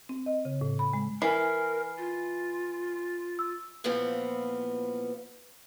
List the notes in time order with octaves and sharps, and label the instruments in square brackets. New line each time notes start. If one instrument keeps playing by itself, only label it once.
[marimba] C4
D#5
C#3
A2
B5
G#3
[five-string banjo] E3 [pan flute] A#4 [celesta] G#5 C7
[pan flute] F4
[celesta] E6
[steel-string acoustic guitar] A#2 E3 F3 B3 C4